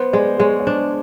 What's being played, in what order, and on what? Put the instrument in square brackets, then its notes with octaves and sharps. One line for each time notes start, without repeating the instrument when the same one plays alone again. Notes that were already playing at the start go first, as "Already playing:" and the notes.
Already playing: [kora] B3 [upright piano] C5
[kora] G#3 [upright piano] D5
[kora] G#3 [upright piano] C#5
[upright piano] C#5
[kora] D4 [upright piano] C5